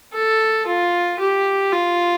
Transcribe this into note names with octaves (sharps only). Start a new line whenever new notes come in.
A4
F4
G4
F4